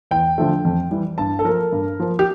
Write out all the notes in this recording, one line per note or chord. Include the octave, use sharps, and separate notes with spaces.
E2 G5
D3 F3 A3
F2
E3 G3
G2 A5
A4
F3 A#3 A#4
G2
F3 A#3
G4